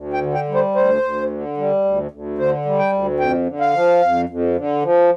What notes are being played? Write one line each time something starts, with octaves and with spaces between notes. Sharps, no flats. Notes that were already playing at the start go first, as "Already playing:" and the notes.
Already playing: D2
G5
D3
G5
G3
C5
D2 C5
D2
D3
G3
D2
D2
D3 C5
G3
G5
D2
F2 G5
D3
F5
F3
F2
F2
D3
F3